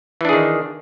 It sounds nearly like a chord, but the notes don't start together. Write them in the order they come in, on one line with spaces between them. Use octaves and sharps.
E3 D4 G#4 D#3